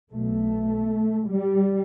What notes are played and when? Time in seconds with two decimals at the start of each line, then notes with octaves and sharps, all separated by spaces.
0.13 B1 B2 A3
1.29 G3